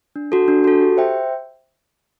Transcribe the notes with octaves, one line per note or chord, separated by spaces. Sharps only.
D4
F#4 A4
D4
F#4 A4
G4
C5 E5 G5